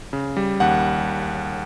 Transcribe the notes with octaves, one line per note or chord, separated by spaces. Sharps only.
C#3
G3
D#2 F#5